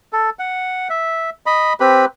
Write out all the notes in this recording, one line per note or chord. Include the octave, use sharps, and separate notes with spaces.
A4
F#5
E5
D#5 B5
C4 G4 B4 B5